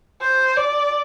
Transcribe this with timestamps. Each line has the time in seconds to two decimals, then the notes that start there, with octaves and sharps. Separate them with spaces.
0.21 C5
0.57 D5